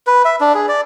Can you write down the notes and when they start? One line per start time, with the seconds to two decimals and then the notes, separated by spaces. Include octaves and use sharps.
0.07 B4
0.25 E5
0.41 D4
0.55 G#4
0.68 D5